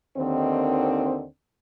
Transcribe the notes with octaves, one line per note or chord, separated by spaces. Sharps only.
D#2 D3 D#3 C4